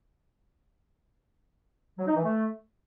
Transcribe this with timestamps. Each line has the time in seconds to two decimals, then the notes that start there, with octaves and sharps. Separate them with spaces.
1.98 F#3
2.07 D#4
2.16 E3
2.24 A3